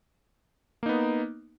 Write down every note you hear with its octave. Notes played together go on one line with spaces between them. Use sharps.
A#3 B3 D#4